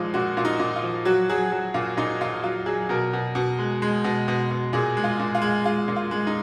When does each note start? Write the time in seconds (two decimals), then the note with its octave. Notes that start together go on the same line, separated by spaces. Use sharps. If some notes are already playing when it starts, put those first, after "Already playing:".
Already playing: A#2 F3 G#3 D#4 F4
0.14 A#2 F#4
0.37 A#2 F4
0.45 D#4
0.59 A#2
0.76 F4
0.84 F3
1.05 F#3 F#4
1.30 F#3 G#4
1.52 F#3
1.74 A#2 F4
1.97 A#2 D#4
2.21 A#2 F4
2.44 F#3 F4
2.66 F#3 G#4
2.89 B2 A#4
3.13 B2
3.35 B2
3.58 G#3
3.82 G#3
4.04 B2
4.28 B2
4.51 B2
4.73 A#2 G#4
4.97 G#3
5.04 F4
5.19 A#2
5.35 F4
5.42 G#3
5.65 G#3 F4
5.88 A#2
5.96 F4
6.11 G#3
6.27 D#4